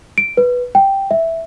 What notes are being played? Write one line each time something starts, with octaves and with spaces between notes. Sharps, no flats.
D7
B4
G5
E5